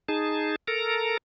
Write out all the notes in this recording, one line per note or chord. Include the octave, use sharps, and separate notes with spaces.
D#4 G#4 A5
A4 A#4 A#5